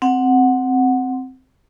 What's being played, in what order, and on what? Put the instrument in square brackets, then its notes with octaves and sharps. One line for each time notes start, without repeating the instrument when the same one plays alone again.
[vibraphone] C4 F#5